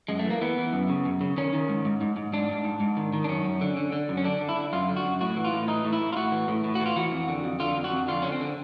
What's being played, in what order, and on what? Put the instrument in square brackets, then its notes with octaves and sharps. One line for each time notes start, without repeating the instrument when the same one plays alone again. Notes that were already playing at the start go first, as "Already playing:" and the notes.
[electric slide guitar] F#2 G#3
A3
E3
A#3
E3 B3
E3
F#2
C#3
F#2
C#3
D#3 C#4
D#3
G#2
G#2
G#2
G#2
G#2 D4
G#2
G#2
G#2
D#3
D#3
D4
F#2 C#4
F#2
D3
D3
D3
F#2
C#4
D3 D4
D3
E4
D3
F#2 F4
D3
F#4
F#2
A2 F#4
E3
F4
A2
E3 D#4
A2
E4
A2
F4
A2 F#4
E3
A2
A2
F#4
E3
F4
E3 F#4
F2
D3
F2
D3 F4
F2
F#4
F2
D3 F4
D3 C#4
C4
D3